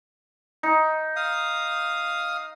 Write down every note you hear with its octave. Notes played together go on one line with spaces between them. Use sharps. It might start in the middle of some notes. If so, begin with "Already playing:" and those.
D#4
F5 D#6